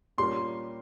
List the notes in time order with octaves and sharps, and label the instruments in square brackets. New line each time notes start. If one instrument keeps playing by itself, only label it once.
[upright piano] A#2 G3 C#4 G4 A#4 [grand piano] C6